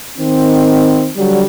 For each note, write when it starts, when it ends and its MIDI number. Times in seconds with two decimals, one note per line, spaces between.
0.18 1.10 51
0.18 1.10 60
1.17 1.44 50
1.17 1.44 54
1.17 1.44 55